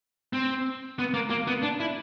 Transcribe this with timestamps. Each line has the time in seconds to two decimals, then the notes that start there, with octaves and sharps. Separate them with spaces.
0.33 C4
0.99 B3
1.14 A#3
1.30 A#3
1.47 B3
1.62 D4
1.80 E4